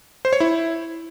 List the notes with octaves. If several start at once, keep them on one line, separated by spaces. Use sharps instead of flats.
C5
C#5
E4